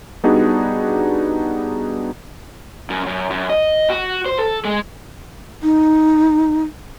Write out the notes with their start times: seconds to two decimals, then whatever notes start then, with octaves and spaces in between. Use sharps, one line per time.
0.24 G3 B3 D4 D#4 F#4 G#4
2.90 F#2
3.07 F#2
3.30 F#2
3.50 D#5
3.90 F#4
4.26 C5
4.38 A4
4.65 G#3
5.63 D#4